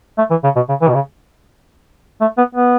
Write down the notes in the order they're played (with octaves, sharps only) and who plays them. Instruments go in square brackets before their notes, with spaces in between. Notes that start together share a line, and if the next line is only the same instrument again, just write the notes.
[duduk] A3
E3
C#3
B2
C#3
E3
B2
C#3
A3
B3
B3